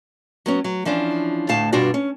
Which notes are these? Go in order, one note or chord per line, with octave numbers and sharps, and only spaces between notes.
F#3 B3 C#4
F#3
E3 F3 C#4 D4
D2 A2 F5 A5
G2 B2 D4 F4 F#4 D5
C#4